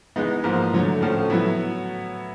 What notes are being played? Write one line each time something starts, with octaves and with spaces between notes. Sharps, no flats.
E3 G#3 B3 D#4
G#2 F3 A#3
D3 F#3 A3
A2 F3 A3 C#4
F#3 B3 E4